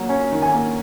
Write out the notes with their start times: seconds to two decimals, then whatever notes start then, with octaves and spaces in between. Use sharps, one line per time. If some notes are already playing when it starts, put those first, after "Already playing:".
Already playing: F#3 A#3
0.09 C#4
0.32 D#3
0.42 G#5
0.53 A#3